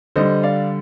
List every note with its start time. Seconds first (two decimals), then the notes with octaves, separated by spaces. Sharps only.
0.16 D3 G3 C5 D#5
0.43 D5 F5